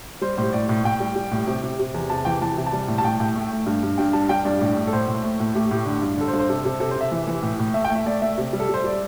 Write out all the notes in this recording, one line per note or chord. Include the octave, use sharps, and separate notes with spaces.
G3 C5
A2 C5
A2 D5
A2
A2 G5
G3
G3
A2
C3
C3
C3
E2
C3 A5
E3 G5
E3 A5
C3
A5
G3
A2
A5
A2 G5
A2 G5
A3
A3
G2
G2
G2 G5
G3 A5
G3 G5
G2 D5
A2
A3
A4
A2 C5
A2
A3
A2
A3 G4
A2 G4
D3
G2
D3 A4
C5
G2 A4
C5
C3 A4
C3 A4
C3 A4
C5
C3 E5
E3
E3
A2
A2
A3 E5
G5
A3
E5
A3 D5
A3 E5
C3
G3
A4
G3 C5
G3 D5